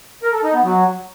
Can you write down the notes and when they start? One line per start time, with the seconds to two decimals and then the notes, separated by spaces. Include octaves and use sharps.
0.23 A#4
0.33 A4
0.43 D#4
0.54 B3
0.64 F#3